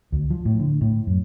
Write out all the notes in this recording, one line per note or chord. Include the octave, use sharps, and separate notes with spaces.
D2
F3
A2
D3
A2
F#2